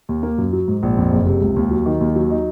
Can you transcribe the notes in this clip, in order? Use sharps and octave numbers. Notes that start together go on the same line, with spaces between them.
D#2
A#3
F#2
F#3
G#2
A#1
F2
F#1
C3
C#2
D#2
F#3
D#3
D#2
F#3
D#4